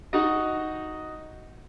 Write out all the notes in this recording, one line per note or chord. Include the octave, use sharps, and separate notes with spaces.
D#4 F#4 D#5